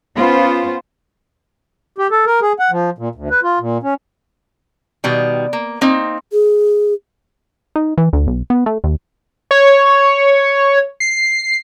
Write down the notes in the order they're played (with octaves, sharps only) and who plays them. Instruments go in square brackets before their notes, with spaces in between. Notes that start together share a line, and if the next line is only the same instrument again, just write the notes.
[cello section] B3 C#4 F4 C5
[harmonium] G4
A4
A#4
G#4
F#5
F3
A#2
D2
B4
F4
A#2
C#4
[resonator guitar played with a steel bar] B2 D#3 G3
A#3
A#3 C4 D#4
[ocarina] G#4
[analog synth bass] D#4
E3
D2
B1
B3
A3
D#2
[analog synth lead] C#5
C7